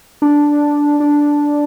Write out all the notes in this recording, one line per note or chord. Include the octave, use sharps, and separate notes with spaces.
D4
D4